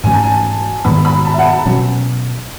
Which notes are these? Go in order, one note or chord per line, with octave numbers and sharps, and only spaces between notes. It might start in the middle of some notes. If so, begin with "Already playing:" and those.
G#2 E3 A3 C#4 G#5
A5
G#5
G#2 D#3 G#3 B3 B5
B5
A5
E5
F#5
A5
B2 F#3 C#4